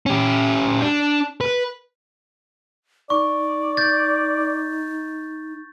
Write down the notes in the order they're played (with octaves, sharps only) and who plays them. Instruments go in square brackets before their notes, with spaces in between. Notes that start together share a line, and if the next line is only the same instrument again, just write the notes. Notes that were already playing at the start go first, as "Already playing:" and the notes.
[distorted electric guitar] C#4 G4
D4
B4
[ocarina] D#4 [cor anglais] D5 [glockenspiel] C#6
[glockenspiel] G6 A6